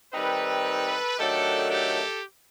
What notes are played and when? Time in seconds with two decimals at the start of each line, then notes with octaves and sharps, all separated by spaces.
0.13 D#3 G3 C4 D#4 A4 B4
1.18 D#3 F#3 A3 D4 G4 A4
1.70 G4 A4